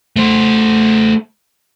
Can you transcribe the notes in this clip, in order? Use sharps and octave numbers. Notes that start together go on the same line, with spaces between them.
A3 C5